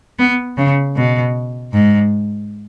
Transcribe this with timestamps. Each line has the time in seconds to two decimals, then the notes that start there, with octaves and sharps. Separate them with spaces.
0.19 B3
0.57 C#3
0.96 B2
1.73 G#2